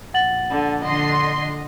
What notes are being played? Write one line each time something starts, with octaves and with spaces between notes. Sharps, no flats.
A#1 F#5 A6 F#7
D3
D3 D#5 C6 C7